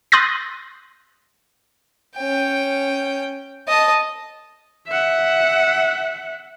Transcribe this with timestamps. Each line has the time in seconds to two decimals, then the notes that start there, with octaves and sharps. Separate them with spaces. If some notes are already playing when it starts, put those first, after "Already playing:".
0.12 C6 D#6 F#6 G6 A6 A#6
2.16 C#4 G5
3.68 D#5 A5
4.87 E5 F#5